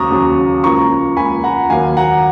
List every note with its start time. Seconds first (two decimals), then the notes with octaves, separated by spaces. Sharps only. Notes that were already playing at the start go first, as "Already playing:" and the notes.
Already playing: D#2 C#3 F#3 A#5 C#6 D#6
0.10 D#2 C#3 F#3
0.63 C#2 C#3 F3 A#3 A#5 C#6
1.17 C#2 C#3 F3 A#3 G#5 B5
1.44 F#5 A#5
1.70 D#2 D#3 F#3 A#3 F5 G#5
1.97 F#5 A#5